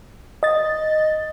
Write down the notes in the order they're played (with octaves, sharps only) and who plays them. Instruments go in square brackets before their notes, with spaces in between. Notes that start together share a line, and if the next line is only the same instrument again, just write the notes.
[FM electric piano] D#5 A6